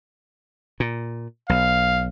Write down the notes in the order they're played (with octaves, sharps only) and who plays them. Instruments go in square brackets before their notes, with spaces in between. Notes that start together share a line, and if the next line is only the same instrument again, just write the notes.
[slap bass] A#2
[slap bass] B1 [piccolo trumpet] F5